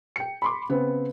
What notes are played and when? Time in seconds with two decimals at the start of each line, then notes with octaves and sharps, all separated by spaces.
0.16 G5 C#7
0.42 B5 C6 D6
0.69 C#3 B3 C4